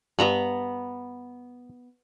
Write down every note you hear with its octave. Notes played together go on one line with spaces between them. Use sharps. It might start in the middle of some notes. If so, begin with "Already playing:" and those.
G2 B3 A#5 B5